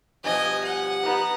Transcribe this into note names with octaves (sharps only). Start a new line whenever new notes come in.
G2 B2 F3 D#5 G#5
F#5
B3 D#4